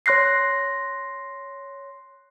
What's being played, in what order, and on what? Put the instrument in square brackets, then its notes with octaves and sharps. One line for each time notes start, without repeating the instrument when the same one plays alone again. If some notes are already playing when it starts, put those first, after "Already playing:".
[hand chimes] C#5 C6 F#6 A#6 C7